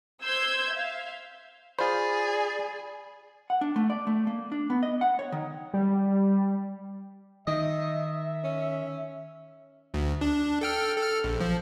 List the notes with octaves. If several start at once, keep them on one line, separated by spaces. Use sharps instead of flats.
C5 C6 E6 G6 G#6
E5 F5
F4 G#4 C5 D5 B5
F#5
D4
A3
D5
A3
A#3
D4
B3
D#5
F#5
C#5
D#3
G3
D#3 D#5 E5
C#4
D2
D4
A4 G5 F6
A4 F6
A#1
F3